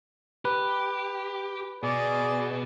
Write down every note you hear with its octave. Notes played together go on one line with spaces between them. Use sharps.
G4 B4
B2 G#4 D5